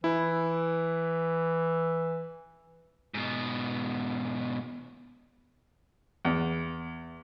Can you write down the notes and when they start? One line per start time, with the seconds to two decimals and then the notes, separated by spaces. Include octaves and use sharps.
0.04 E3 E4
3.14 G#2 B2
6.25 E2